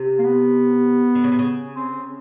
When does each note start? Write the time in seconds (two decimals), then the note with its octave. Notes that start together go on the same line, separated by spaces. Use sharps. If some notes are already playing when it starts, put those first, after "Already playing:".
Already playing: C3
0.18 A#3
0.24 B3
1.15 D3
1.24 C#3
1.31 C3
1.39 C#3
1.76 C4